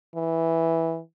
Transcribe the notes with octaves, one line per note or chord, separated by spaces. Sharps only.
E3